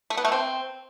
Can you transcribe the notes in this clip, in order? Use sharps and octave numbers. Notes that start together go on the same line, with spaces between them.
A3
B3
A3
C4